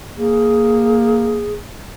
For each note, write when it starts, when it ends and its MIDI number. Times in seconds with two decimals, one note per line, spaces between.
0.18 1.58 58
0.18 1.53 68